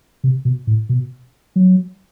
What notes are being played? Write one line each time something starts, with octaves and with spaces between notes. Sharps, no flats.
C3
B2
A2
B2
F#3